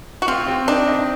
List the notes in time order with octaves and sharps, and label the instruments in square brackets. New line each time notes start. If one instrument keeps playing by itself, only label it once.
[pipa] F#4
[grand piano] C4 [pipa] F4
[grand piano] C4
[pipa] D4 [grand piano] D#4
[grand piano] D#4